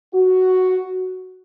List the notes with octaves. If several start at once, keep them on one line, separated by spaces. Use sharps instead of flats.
F#4